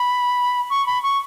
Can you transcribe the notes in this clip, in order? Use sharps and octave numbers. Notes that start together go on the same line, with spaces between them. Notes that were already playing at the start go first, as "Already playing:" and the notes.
Already playing: B5
C#6
B5
C#6